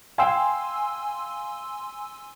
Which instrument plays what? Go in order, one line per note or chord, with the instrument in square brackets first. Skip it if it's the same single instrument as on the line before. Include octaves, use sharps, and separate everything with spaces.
[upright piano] F5 G5 [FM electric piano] G#5 C6 E6